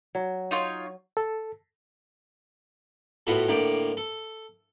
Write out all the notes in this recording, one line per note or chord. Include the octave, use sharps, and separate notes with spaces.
F#3
D#4 F4 C#5
A4
A2 B3 F4 F#4 A4
A2 D3 A#3 D5 G5
A4